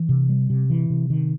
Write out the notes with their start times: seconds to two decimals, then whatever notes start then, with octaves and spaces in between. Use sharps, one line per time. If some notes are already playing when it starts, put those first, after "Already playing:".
Already playing: E3
0.09 C3
0.29 G3
0.50 C3
0.70 E3
0.90 C3
1.10 D#3